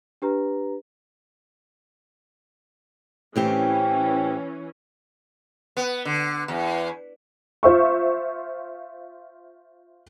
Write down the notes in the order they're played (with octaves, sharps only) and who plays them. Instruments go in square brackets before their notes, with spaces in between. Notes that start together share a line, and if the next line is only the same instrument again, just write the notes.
[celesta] D4 G4 B4 A#5
[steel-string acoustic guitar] A2 C4 G4 [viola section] E3 C#4
[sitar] B3
D3
E2
[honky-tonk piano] F4 C5 E5 C#6